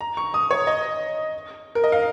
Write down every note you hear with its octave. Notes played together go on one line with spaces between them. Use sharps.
A#5
C#6
D#6
C#5
D#5
A#4
D#5
F5